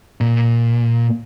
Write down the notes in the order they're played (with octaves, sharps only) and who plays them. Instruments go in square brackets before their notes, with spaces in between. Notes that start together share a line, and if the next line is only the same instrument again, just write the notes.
[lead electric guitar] A#2